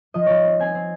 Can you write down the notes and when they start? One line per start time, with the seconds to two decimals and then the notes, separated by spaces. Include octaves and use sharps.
0.14 F3 D#5
0.26 F3 C#5
0.45 C4
0.60 C4 G#5
0.75 C4